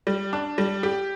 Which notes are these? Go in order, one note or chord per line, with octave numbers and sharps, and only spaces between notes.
G3
D4
G3
G4